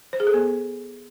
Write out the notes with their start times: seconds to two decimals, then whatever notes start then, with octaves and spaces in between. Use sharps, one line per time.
0.13 C5
0.20 G#4
0.27 A4
0.34 B3